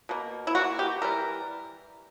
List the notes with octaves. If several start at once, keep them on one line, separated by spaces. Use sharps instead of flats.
B2 A#3
E4
E3 A#3 F#4
G4
E3 G3 A#4